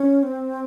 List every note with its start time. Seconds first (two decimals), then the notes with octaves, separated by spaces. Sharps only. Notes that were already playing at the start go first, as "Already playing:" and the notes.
Already playing: C#4
0.23 C4